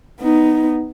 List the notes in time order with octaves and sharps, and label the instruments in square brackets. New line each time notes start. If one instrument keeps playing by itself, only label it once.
[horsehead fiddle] B3 D#4